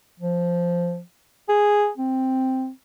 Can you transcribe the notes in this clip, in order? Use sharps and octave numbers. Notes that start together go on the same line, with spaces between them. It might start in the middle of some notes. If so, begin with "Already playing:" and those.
F3
G#4
C4